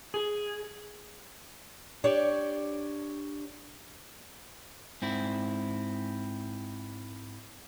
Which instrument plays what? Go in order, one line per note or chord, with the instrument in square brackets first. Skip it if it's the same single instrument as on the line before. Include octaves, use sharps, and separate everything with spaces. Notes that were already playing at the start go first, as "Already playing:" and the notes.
[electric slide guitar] G#4
[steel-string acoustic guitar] D4 G4 C#5 D5
[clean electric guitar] G#2 C4 E4